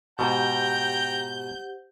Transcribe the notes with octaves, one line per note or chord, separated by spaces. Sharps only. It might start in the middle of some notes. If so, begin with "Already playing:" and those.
G#2 B2 G4 C5 F#5 G5 A#5 G6